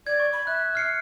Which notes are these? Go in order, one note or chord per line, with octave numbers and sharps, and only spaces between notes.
D5 G#6
C#6
B5
E5 F#6
F6 C7 C#7